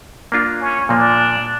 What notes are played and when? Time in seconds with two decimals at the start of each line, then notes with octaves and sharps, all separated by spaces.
0.32 A#3 D4 F4
0.61 C#4
0.89 A#2 F3 A#3 D4